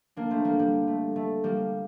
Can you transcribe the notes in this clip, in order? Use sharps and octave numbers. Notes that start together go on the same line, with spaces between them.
A#3 D4
A3 C4
G3 A#3
G3
A3
A3
G3 A#3